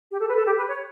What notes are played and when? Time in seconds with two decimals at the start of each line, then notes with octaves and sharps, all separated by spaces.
0.11 G4
0.20 A4
0.28 B4
0.37 A4
0.46 G4
0.57 B4
0.69 C#5